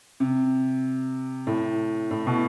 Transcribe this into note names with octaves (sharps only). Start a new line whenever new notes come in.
C3
A2
A2
B2